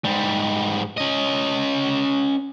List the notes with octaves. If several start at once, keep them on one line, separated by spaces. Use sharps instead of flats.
G#2 G3
C#4 D#5